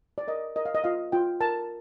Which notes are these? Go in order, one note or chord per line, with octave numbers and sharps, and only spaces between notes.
D5
A#4 D#5
A#4 D#5
F5
D#5
F4 F5
F4 G5
A#4 A5